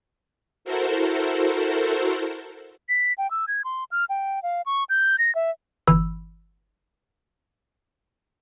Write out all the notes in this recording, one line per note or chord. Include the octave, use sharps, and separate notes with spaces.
E4 F#4 A4 A#4 C5
B6
G5
E6
G#6
C6
F6
G5
F5
C#6
G6
A#6
E5
G1 E3 B5 E6